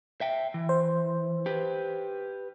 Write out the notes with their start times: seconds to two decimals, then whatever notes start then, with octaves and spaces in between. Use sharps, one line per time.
0.21 E5 G5
0.54 E3
0.69 C5
1.46 G4 B4